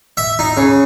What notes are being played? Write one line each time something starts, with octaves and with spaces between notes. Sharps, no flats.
E5
D#4
C#3